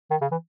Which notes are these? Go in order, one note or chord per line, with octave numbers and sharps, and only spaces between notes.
D#3
C#3
E3